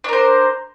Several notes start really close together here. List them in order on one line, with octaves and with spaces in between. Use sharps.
D4 A#4 C5